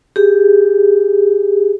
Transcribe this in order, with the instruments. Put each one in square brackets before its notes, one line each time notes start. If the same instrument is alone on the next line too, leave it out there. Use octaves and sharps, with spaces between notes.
[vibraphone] G4 G#4